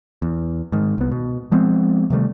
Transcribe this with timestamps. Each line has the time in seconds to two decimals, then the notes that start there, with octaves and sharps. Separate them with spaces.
0.22 E2
0.72 G#2 D#3
0.98 C2 B3
1.12 B2
1.52 F3 G#3 B3 C4
2.10 C3 D#3 G3 A3